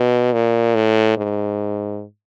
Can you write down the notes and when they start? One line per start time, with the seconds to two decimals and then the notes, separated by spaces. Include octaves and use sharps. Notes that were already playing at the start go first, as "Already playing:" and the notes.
Already playing: B2
0.33 A#2
0.75 A2
1.17 G#2